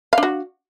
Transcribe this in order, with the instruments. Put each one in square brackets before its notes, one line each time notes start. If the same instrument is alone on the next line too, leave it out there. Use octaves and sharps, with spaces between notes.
[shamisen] F5
D4
F#4